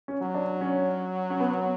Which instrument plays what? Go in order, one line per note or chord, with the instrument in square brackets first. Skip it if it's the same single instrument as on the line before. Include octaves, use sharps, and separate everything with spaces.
[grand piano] C#4
[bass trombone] F#3
[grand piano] D4
C#4
C#4
B3